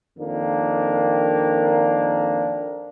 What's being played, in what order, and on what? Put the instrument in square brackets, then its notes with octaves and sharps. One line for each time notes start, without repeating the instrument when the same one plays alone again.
[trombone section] F2 D#3 A#3 D4